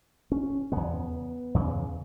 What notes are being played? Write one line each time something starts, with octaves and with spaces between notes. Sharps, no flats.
C#4
E2 C#3 B3
E2 C#3